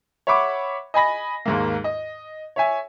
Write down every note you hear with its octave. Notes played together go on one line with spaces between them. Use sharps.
C#5 E5 F#5 B5 C#6 D6
D#5 G#5 B5 A#6
D#2 G#2 A#3
D#5
C#5 E5 G#5